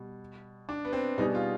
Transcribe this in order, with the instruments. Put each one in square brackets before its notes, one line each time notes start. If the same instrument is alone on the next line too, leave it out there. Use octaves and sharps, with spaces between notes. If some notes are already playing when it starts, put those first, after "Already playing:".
Already playing: [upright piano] B2 G3
[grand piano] D4
B3
C4
[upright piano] B2 G3 B3 D4 G#4 [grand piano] D#4
[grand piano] F4